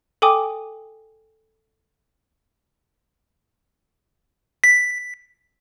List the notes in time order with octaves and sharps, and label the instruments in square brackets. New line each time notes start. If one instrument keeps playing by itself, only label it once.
[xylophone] A4 G5 G#5 D6 D#6
[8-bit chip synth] B6